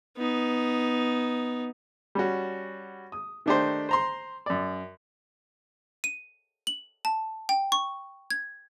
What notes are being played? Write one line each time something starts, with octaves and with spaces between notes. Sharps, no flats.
B3 D#4
G3 C#4 F#4
D#6
D#3 A3 D4 D#4 G4 C5
C5 A#5 C6
F#2 D5
D#7
F#7
A5
G5
C#6
G#6